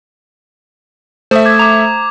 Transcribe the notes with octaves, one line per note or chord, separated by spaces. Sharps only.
A3 C5 E5 D#6
D6 G#6
A#5 D6 F7